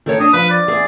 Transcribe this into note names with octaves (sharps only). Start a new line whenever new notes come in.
D#3 A4 C#5
D4 D#6
F3 B4
D5
E2 G#4